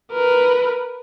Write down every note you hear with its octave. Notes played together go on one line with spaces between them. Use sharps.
A#4 B4